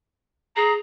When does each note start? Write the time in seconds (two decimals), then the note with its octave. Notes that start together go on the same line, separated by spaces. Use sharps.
0.57 G#4 A#5